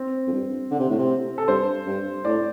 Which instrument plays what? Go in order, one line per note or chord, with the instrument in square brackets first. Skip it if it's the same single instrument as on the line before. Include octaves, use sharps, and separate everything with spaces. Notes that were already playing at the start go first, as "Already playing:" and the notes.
Already playing: [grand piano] C4
[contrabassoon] F2
G2
D3
C3
A2
C3
[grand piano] A4
[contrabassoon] G2 [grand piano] C5
[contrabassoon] G2
[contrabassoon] A2 [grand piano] D5